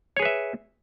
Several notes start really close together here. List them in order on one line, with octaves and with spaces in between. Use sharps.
C#5 G#4 B4 E5